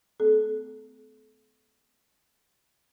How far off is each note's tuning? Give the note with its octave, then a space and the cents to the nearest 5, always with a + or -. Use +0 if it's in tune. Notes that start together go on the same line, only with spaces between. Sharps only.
A3 +0 C4 -40 A4 -30